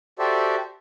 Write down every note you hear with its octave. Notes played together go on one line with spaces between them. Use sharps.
F#4 G4 A4 C5 D5 E5